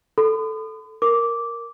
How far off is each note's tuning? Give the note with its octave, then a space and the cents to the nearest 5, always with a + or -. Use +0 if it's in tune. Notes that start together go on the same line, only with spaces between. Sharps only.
A4 +0 B5 +45
A#4 +0 D6 -10